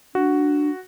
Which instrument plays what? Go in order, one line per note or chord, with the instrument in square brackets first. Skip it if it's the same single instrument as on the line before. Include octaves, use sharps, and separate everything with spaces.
[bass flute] D4 [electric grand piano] F#4